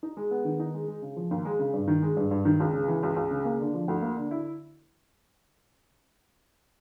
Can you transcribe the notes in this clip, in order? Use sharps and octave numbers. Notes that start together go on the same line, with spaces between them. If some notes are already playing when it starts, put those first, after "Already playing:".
D#4
G#3
B3
D#3
D#4
G#3
G#3
C#3
F3
D#2
G#3
C#3
G2
D#3
G#3
G2
G2
D#3
C#2
C#3
E3
C#2
C#2
C#3
A#3
D3
F3
D2
A#3
D3
E4